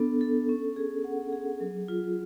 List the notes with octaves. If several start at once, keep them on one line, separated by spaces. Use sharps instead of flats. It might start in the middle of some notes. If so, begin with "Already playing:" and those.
Already playing: B3 D4 A4
A4
C#4
G#4
F#5
G#4
F#3
F4